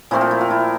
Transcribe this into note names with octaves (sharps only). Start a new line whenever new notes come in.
A#2 F3 A3 C4 E4
F4
E4
F4
E4